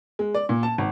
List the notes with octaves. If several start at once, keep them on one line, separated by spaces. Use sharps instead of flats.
G#3
D5
A#2
A5
G#1